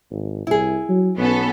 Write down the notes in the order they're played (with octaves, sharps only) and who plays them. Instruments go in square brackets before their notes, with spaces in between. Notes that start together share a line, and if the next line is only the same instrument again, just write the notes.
[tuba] G#1
[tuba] C2 [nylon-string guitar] E4 G#4
[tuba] F#3
[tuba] B1 [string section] B3 C#4 A4